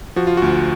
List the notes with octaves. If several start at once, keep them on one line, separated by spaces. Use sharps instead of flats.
F3 F#4
F4
D2 F#4